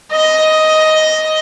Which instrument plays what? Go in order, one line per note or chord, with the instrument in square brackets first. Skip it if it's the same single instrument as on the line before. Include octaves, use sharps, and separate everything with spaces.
[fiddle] D#5